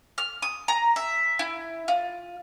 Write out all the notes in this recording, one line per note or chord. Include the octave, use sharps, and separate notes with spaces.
F6
D#6
A#5
E5
E4
F4